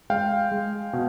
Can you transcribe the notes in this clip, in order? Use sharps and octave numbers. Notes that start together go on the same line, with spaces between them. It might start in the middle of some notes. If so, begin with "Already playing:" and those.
G#3 F5 G5
G#3
B2